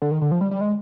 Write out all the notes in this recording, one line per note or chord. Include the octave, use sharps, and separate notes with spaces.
D3
D#3
D3
F3
G3
G3
G#3